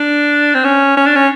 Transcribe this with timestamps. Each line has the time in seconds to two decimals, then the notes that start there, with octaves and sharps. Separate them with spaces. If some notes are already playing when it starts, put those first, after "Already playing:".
Already playing: D4
0.55 C4
0.64 C#4
0.97 C#4
1.06 D4
1.15 C#4